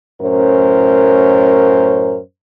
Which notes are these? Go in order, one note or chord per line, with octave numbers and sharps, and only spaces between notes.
F#2 A2 C#4 A#4 C5